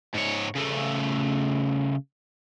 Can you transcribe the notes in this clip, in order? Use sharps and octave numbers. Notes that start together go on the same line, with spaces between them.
G#2 C#5
C#3 A3